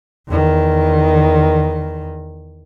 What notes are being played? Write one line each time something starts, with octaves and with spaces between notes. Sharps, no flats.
E2 D#3